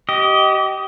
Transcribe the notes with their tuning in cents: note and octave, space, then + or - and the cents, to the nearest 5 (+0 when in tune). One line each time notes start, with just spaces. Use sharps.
G4 -25 D#5 +10